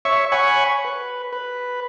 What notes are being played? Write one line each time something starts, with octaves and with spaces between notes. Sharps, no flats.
C#5 E5 C#6
C#5 F#5 G#5 B5 C#6
B4
B4